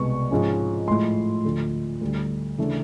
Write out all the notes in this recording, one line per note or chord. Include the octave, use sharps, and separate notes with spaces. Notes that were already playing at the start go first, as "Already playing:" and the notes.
Already playing: C2 B2 G#3 B3 C#6
G#2 F3 G#3 C#4
A2 F3 G#3 C6
D2 D3 F3
D2 D3 G3
C#3 E3 A3 D4